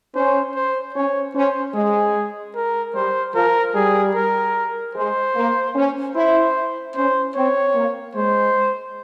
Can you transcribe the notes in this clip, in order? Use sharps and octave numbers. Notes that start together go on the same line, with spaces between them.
C#4 C5
C5
C#4 C#5
C#4 C5
G#3 G#4
A#4
G3 C5
F3 A#4
G3 G#4
A#4
G#3 C5
A#3
C#4
E4 C5
C#4 C5
C4 C#5
A#3
G#3 C5